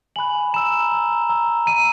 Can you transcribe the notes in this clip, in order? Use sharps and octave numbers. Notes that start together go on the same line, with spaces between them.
G#5 B5 F#6 F#7
A#5 E6 E7
A#5 E6
A#5 E6
A#5 E6 D#7